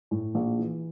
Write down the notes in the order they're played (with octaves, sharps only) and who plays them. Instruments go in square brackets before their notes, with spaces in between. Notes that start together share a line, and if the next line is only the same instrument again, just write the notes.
[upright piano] A2
A#1
E3